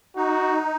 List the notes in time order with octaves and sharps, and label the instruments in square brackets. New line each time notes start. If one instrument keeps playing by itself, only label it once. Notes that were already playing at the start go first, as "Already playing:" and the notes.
[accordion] D#4 [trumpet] F#4